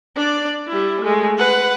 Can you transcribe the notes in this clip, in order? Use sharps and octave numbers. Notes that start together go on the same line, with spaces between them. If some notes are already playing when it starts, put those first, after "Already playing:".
D4 D5
G3 E4
G#3 A3
B4 F#5